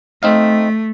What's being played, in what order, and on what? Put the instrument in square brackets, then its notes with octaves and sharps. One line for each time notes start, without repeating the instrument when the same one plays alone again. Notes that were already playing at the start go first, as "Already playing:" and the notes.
[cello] A3 [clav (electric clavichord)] C4 D#4 F5